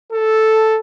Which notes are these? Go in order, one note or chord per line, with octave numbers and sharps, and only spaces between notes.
A4